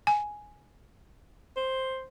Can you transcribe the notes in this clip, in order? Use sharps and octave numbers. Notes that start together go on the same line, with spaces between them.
G#5
C5